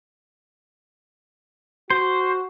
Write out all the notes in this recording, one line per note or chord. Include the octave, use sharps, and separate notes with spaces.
F#4 C5